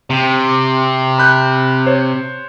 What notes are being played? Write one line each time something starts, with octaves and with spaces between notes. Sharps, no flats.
C3
B5 F#6 G6
C5 C#5